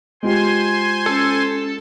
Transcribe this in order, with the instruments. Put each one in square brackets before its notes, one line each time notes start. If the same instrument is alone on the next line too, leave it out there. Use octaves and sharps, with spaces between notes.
[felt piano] G#3 F4 G4 [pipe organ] C5 G#5 C6
[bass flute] C#4 [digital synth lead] A4